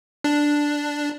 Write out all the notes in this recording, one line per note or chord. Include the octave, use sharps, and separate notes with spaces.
D4